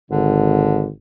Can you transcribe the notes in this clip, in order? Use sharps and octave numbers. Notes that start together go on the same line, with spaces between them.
G#1 D3